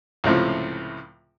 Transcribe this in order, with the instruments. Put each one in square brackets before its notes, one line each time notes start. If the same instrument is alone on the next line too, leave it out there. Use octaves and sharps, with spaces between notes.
[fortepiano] C#2 A2 C3 F3